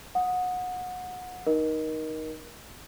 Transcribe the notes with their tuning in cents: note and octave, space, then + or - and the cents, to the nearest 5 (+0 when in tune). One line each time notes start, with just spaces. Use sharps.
F#5 -25 D#6 +0
D#4 +0 A#4 +25 D#5 +0